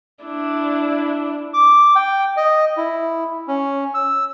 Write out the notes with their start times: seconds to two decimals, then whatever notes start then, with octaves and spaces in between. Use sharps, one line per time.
0.24 D4 E4
1.54 D6
1.96 G5
2.37 D#5
2.77 E4
3.48 C#4
3.94 E6